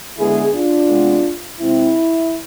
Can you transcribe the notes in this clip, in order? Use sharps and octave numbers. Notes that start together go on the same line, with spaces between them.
D3 G#3 B3 E4 G#4
D4 F4
C3 G#3 B3
C3 G#3 C4 E4